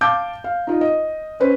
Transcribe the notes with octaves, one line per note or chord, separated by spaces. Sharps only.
F5 A5 D6 G6
F5
D#4 F4 D#5
D#5
C#4 B4 C5